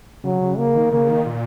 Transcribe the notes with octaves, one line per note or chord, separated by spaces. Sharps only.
C#3 F#3
C#3
C#3 A#3
D#3
C#3 A#3
D#3
A#2